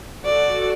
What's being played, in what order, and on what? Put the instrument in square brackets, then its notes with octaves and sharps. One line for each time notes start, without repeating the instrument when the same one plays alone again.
[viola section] F#4 A4 [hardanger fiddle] D5